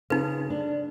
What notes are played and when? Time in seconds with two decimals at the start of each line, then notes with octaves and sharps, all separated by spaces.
0.10 C#3 D#4 B4
0.50 D4